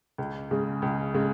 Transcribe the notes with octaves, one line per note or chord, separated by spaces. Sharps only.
C#2
C#3 G#3
C#2
C#3 G#3